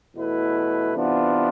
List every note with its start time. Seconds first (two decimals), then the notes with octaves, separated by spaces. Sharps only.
0.14 E2 B2 A3 E4 B4
0.92 C3 E3 B3 D4 F4